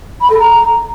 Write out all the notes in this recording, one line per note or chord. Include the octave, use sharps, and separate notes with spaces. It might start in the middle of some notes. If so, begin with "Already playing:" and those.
B5
A4
A#5